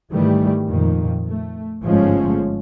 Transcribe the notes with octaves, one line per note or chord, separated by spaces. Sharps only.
G#2 D#3 E3 G3 A3
F2 A#2 D#3
A3
G1 G#2 F3 G#3 A3 C#4